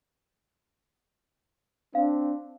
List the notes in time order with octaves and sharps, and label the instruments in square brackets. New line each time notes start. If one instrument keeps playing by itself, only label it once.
[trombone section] C4 D4 [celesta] F5